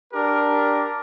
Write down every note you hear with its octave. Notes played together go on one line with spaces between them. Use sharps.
D4 G4 A#4